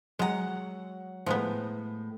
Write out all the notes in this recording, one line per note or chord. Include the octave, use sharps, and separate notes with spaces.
F#3 G#3 F#5 A#5
A2 F3 G#3 B3